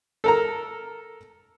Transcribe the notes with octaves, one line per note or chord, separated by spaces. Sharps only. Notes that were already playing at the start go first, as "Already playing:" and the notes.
A4 A#4 A#5